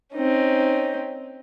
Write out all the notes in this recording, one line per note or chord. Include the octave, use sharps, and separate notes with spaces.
C4 C#4 D#4